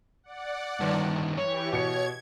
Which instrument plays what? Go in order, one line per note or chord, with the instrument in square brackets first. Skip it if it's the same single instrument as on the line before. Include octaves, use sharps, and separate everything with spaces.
[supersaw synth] D5 F#5
[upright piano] G1 [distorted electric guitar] G2 D#3
[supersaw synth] E3 G4 [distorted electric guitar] C#5
[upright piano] B2 C#7 [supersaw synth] G#6